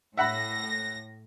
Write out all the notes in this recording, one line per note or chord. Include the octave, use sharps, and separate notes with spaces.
A2 E5 F#5 B5 A#6